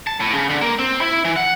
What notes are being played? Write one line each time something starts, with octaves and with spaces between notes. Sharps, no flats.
A5
A2
C#3
D3
A#3
C4
E4
E3
F#5